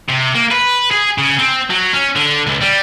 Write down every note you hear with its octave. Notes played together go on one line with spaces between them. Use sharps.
C3
A#3
B4
G#4
C#3
C4
F#3
C#4
D3
C#2
G3